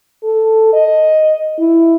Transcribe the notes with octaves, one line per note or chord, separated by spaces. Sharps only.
A4
D#5
E4